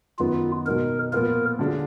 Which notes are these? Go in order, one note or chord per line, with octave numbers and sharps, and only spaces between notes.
F#2 D#3 F#3 B3 D#4 F4
B2 F#3 B3 D#4 A#4
A#2 F3 B3 F4 A#4
D3 F#3 D4 F4 G#4